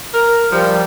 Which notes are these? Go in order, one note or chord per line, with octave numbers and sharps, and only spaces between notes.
A#4
F3 G3